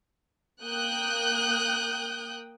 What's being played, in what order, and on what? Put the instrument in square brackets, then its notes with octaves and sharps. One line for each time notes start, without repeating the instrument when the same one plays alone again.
[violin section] A#3 G5 D#6 F#6 G6